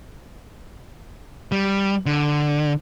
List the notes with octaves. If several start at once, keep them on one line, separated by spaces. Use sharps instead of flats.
G3
D3